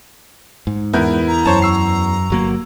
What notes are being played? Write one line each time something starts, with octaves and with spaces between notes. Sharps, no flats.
G#2
E2 B3 E4 A#4 F#6 G6
A#5
F#2 C5 C#5 A5
C#6 E6 C7
G1 F#3 A#3